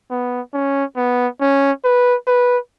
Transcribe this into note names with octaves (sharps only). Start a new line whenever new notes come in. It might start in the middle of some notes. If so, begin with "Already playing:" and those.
B3
C#4
B3
C#4
B4
B4